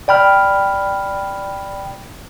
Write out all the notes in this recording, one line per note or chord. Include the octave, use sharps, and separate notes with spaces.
D5 G5 B5 F6